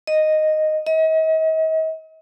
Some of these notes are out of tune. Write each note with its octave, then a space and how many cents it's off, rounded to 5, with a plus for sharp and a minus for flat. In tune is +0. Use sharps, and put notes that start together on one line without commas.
D#5 -5
D#5 +40